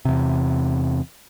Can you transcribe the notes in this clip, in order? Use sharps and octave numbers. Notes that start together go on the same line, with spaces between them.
E2 C3